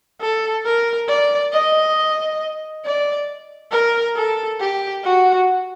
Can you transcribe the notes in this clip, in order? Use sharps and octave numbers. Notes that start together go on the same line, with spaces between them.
A4
A#4
D5
D#5
D5
A#4
A4
G4
F#4